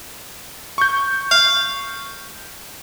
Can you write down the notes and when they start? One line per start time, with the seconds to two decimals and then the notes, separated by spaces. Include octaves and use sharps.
0.78 C#6 G6
1.31 F5